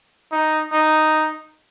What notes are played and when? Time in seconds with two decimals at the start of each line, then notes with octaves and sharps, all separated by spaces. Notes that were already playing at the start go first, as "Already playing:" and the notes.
0.32 D#4
0.72 D#4